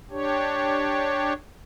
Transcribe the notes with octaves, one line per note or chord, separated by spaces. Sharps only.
D4 G4 C#5